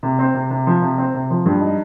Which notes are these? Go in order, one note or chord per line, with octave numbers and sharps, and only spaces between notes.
C3
C4
C3
C3
F3
C3
C4
C3
F3
G2
D#4